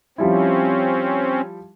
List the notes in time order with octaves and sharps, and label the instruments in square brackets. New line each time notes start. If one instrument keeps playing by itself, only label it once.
[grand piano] F3 G3 E4 [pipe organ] C4 C#4